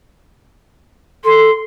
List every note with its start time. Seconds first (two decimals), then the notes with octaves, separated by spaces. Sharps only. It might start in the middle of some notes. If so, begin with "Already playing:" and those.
1.24 A4 C6